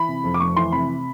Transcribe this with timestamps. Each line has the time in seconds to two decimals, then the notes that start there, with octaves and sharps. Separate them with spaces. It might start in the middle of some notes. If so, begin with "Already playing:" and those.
Already playing: E3 B5
0.09 C3
0.24 F2
0.34 D6
0.40 F1 C#6
0.56 E3 C6
0.72 C3 B5